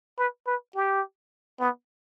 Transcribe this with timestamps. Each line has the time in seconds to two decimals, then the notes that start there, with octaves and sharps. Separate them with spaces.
0.18 B4
0.47 B4
0.75 G4
1.60 B3